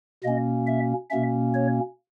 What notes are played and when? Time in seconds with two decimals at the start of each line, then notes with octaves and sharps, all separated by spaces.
0.24 B2 A#3 C#4 D#5
0.67 E5
1.10 B2 A#3 C#4 E5
1.54 C#5